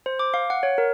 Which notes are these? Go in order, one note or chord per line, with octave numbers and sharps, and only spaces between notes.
C5
D6
F5
F#5
C#5
A#4